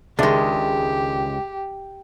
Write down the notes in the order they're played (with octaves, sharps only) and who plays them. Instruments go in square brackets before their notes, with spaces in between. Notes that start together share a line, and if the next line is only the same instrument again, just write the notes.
[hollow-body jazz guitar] C#2 G#3 [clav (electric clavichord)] D#3 D4 [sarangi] G4 [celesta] G#4 E5 D6